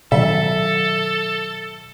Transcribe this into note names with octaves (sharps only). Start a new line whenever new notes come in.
B2 D#3 F#3 A4 E5